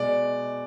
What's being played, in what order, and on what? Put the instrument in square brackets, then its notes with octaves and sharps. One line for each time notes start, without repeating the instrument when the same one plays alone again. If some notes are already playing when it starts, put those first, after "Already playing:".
Already playing: [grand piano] B2 G#3 D5